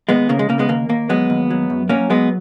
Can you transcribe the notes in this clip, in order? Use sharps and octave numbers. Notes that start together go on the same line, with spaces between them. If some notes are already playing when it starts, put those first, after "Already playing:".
D#2 G#3 B3
C#3 A#3
G#3
C#3 A#3
G#3 B3
D#2 A#3
D#2 A#3
F#3 G#3 B3
D#2
F#3
F#2
F#3 A#3 C#4
F#3 G#3 B3